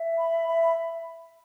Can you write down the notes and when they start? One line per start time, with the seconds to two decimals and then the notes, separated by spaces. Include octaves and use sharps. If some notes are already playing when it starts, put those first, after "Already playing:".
Already playing: E5
0.18 B5
0.47 E5